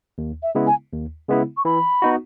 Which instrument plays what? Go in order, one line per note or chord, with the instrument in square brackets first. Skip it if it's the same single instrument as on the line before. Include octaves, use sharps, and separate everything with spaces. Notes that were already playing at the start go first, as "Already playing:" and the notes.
[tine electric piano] D#2
[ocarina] E5
[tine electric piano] C#3 G#3 B3 E4
[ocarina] G#5
[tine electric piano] D#2
C#3 G#3 B3 E4
[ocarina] C#6
[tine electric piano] E3 [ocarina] B5
[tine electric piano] B3 D#4 F#4